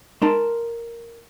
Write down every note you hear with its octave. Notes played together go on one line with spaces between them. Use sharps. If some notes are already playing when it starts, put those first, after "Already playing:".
G#3 D#4 A#4 A5 C6